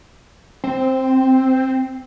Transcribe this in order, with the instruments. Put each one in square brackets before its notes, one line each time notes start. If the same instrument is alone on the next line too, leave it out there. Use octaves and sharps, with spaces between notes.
[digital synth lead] C4